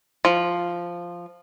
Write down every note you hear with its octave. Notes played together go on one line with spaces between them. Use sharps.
F3